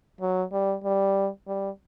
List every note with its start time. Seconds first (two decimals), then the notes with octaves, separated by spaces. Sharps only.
0.21 F#3
0.52 G3
0.84 G3
1.47 G3